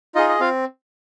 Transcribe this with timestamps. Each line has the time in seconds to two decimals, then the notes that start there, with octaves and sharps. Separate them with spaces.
0.15 D#4 F4 G#4 D#5
0.29 D#5
0.40 C4 F4 F5